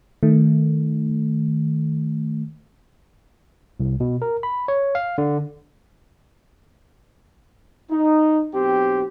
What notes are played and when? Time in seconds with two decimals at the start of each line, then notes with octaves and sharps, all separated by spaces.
0.23 D#3 A3
3.80 C2
4.00 B2
4.22 A#4
4.43 B5
4.68 C#5
4.95 F5
5.18 D3
7.90 D#4
8.53 B1 C4 G4